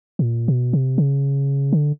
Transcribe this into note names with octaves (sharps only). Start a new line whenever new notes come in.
B2
A#2
B2
C3
C#3
D3